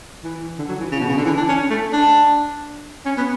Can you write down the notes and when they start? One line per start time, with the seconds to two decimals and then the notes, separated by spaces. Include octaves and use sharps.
0.24 E3
0.58 D3
0.68 F#3
0.80 E3
0.91 C#3
1.00 B2
1.08 C#3
1.17 D3
1.25 E3
1.37 D4
1.48 C#4
1.70 A3
1.93 D4
3.05 C#4
3.17 B3